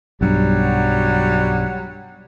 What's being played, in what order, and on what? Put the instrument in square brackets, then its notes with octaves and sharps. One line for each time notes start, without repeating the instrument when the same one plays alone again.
[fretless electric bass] B1 G2 [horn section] F#3 G3